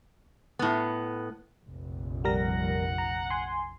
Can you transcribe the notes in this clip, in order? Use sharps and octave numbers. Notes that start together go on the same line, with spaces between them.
A2 B3
F1 A#1
G3 A#4 F#5 A#6
A#5
G#5 C6